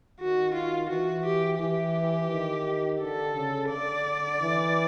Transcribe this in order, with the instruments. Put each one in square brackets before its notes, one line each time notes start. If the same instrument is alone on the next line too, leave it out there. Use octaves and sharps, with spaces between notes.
[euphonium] D#3 [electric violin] F#4
[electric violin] F4
[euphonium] E3 [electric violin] F#4
[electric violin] G4
[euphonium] E3 [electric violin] G4
[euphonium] D#3
[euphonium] D3 [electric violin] A4
[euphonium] C#3
[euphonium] D3 [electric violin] D5
[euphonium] E3